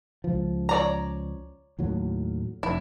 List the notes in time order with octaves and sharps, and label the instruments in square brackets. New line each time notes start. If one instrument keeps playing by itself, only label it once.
[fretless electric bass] C#2 F3
[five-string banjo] C#5 D5 A#5
[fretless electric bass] D#2 A2 F#3
[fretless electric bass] F1 [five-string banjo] E4